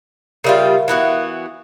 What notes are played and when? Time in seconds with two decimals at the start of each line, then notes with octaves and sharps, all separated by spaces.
0.44 C#3 G3 F4 A#4 E5 F5
0.88 E3 B3 F#4